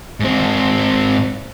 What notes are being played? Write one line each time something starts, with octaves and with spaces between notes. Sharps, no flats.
G#2 C4